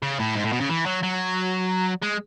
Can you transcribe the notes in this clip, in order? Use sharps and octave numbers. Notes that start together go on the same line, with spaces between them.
C#3
A2
G#2
A2
B2
C#3
E3
F#3
F#3
G#3